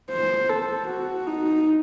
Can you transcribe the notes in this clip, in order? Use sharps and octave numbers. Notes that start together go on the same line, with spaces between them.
C5
A4
F#4
D#4